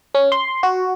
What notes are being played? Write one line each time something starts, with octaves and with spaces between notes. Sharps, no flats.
C#4
C6
F#4